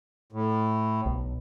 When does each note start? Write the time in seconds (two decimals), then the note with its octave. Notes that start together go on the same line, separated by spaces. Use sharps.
0.32 A2
1.06 B1